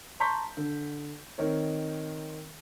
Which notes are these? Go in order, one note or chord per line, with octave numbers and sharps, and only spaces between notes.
A5 A#5 C6 C#6 G6 B6
D3
D#3 C4 D#4 A#4 C#5